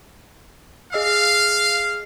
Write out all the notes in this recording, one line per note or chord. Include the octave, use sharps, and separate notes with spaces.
G#4 D#5 F5 E6